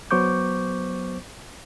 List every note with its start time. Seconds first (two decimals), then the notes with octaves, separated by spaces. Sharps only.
0.11 F#3 B3 C5 C#6 D6 G6